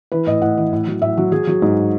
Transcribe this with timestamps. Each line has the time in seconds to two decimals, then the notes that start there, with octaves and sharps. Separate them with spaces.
0.12 E3 B4
0.27 A2 D#5
0.42 A2 F#5
0.57 E3
0.73 A2
0.87 F#3
1.02 A2 E5
1.17 F#3
1.32 F#3 G#4
1.47 F#3
1.62 G#2